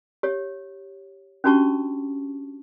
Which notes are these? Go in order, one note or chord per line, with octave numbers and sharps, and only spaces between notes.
G4 C#5
C#4 D4 F#4 G4 A5 C#6